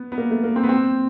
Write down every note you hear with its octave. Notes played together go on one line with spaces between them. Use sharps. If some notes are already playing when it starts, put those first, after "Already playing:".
Already playing: B3
B3
A#3
A3
A#3
C4
B3
C4